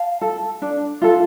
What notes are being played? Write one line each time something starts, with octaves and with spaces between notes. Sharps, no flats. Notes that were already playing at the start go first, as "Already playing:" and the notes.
Already playing: F5 A5
A4
D4
F4 A4